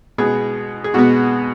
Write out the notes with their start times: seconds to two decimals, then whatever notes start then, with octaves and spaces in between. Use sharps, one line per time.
0.18 B2 G#3 B3 G#4
0.84 G#4
0.94 B2 G#3 B3 F#4